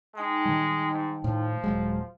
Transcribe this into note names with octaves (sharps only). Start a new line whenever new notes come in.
G#3 D#4 G5 A5
D#3 G3
G#2
A2 F3
D#1 F#3 G#3